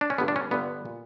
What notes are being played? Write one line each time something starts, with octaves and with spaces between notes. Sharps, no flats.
D4
C#4
G1 G2 D3 B3
D4
C#4
G1 G2 D3 B3
A#2